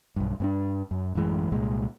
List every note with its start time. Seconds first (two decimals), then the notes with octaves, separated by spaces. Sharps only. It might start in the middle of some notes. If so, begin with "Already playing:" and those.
0.16 B1 G2
0.40 G2 A#3 D4
0.91 F#2
1.15 A1 F#2 E3 G#3
1.52 C2 A#2 G#3